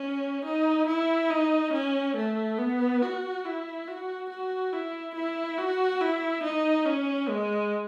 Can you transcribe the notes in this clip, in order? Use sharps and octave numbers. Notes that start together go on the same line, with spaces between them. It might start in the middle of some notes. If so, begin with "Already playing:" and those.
Already playing: C#4
D#4
E4
D#4
C#4
A3
B3
F#4
E4
F#4
F#4
E4
E4
F#4
E4
D#4
C#4
G#3